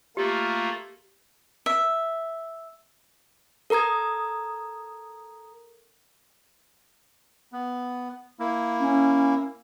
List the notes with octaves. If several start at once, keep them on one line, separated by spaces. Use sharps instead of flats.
A3 A#3 F4 G4
E5
A4 A#4 A#5 D#6 G#6
B3
A#3 E4
C#4